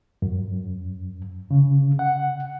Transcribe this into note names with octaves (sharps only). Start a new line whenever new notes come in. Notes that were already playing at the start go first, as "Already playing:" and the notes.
F#2
C#3
F#5